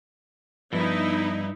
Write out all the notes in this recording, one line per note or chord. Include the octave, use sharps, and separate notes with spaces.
G2 F3 B3 D#4 E4 B4